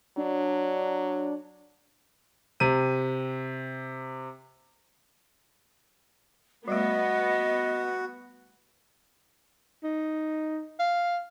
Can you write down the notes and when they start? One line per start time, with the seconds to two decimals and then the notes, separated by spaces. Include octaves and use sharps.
0.17 F#3 D4
2.60 C3 D#7
6.68 G3 A3 B3 F#4 D#5
9.83 D#4
10.79 F5